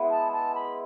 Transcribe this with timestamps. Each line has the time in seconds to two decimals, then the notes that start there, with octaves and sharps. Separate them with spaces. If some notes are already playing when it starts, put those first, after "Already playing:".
Already playing: G#3 B3 E4
0.10 A5
0.32 A5
0.55 B5